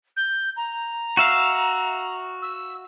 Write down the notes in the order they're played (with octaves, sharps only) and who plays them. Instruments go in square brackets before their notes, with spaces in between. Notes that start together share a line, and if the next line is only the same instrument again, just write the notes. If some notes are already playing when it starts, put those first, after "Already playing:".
[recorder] G6
A#5
[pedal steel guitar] F#4 E5 F5
[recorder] E6